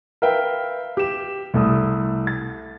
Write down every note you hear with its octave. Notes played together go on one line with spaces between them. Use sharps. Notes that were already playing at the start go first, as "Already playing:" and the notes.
A#4 B4 E5 F5 G5
G4 E7
C2 A3 D#6
A6